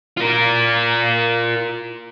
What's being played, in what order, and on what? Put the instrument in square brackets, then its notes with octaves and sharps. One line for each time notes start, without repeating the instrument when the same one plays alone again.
[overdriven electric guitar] F4 A#4